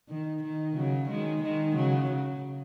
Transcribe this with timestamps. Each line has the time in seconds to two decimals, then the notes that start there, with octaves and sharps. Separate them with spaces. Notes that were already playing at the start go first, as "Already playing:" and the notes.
0.09 D#3
0.43 D#3
0.76 C#3 F#3
1.09 D#3 G#3
1.42 D#3 G#3
1.76 C#3 F#3
2.10 C#3